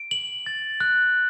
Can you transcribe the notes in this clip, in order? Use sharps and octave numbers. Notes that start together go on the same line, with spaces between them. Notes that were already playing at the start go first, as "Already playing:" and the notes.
Already playing: D7
F#7
A6
F#6